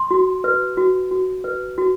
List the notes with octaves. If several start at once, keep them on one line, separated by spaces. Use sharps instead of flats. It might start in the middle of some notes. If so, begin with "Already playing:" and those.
Already playing: C6
F#4
B4
F#4
F#4
B4
F#4